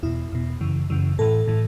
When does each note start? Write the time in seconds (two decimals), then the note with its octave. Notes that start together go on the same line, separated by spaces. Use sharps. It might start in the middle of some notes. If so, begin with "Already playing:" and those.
0.03 E2 B2 E4
0.32 E2 B2
0.61 F#2 C#3 E3
0.90 F#2 C#3 E3
1.19 A2 E3 A4
1.48 A2 E3